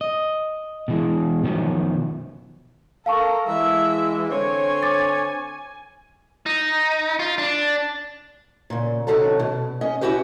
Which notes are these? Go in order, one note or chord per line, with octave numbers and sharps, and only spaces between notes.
D#5
B2 E3 G#3
B2 D#3 F3 F#3
A4 A#4 F5 A5 C#6
E3 G#3 E5
D3 C4 C#5 G#5
D6 A6
D#4
F4
D4
A#2 C#3
C3 D#3 F#3 C#4 F#4 A4
B2
C#4 D#5
C#4 E4 F#4 G4 B4